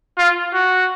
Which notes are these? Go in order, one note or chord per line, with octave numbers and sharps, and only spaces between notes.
F4
F#4